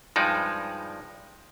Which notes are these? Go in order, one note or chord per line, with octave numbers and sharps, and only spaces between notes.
G2 F3 G#3 D#4 D5